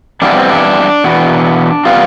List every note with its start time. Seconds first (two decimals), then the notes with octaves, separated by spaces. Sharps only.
0.22 F2 E3 G3 B3 D4
0.36 C4
0.50 D4
1.04 E2 B2 B3
1.85 C3 G3 B3 F4